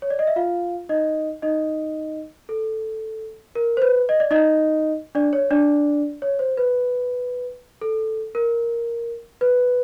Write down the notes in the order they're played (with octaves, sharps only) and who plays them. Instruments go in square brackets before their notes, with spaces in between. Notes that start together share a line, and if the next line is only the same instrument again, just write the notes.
[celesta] C#5
D5
D#5
E5
F4 F5
D#4 D#5
D#4 D#5
A4
A#4
C5
B4
D#5
D5
D#4 D#5
D4 D5
C#5
D4 D5
C#5
C5
B4
A4
A#4
B4